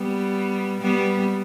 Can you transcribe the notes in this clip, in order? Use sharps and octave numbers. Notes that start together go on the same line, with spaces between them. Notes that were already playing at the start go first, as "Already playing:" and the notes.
Already playing: G3 B3
G3 B3